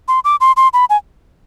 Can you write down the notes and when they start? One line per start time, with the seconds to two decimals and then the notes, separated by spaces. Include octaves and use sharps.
0.08 C6
0.24 D6
0.41 C6
0.57 C6
0.73 B5
0.90 G#5